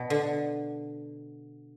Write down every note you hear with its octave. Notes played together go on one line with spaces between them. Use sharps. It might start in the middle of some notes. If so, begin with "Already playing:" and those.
Already playing: B2
D3